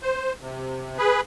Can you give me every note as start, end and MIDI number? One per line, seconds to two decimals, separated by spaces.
0.02 0.33 72
0.42 0.98 48
0.98 1.21 68
0.98 1.21 71